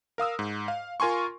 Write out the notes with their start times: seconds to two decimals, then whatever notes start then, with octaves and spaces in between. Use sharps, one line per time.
0.18 A#4 F5 D#6 E6
0.39 G#2
0.68 F5
1.00 F4 A#4 G#5 C6 C#6